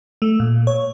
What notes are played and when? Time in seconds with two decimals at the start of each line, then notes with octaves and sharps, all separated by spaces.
0.22 A3
0.40 A#2
0.67 C#5